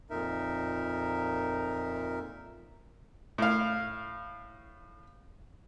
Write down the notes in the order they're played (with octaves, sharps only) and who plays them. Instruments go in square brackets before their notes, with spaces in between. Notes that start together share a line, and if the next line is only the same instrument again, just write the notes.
[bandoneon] F2 A#2 D#4 A#4 E5
[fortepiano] A2 F5